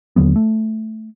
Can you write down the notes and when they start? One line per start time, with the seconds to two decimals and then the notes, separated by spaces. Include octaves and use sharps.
0.16 D#2 D3 F#3 B3
0.36 A3